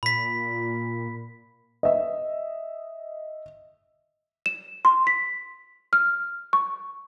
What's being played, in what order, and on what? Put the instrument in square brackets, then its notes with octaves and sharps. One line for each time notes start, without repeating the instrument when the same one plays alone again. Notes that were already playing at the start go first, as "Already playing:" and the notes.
[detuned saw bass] A#2 [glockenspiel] B5 B6
[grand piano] D#5 E5
[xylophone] E7
C6
B6
F6
C#6